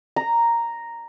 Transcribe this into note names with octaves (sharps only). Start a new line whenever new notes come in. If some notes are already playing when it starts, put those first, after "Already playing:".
A#5